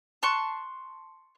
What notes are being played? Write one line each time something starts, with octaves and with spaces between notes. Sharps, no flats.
A5 C6 C#6 F#6